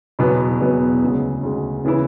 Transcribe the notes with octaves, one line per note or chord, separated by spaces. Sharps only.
E2 B2 F#3 B3
E2 B2 F#3 B3
D2 C#3 G#3
D2 C#3 G#3
C#3 E3 B3 E4